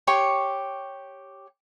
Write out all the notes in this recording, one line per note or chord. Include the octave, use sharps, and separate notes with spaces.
G4 C#5 C6 C#6